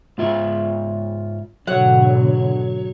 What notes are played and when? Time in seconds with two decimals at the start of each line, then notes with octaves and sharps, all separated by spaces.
0.18 G#2 F4 E5
1.67 G#2 B2 D3 F#3 C#5 F#5